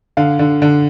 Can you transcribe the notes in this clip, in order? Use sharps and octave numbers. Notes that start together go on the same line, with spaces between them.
D3 F5
D3
D3